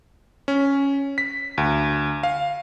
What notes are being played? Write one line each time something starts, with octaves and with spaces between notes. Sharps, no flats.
C#4
B6
D2
F5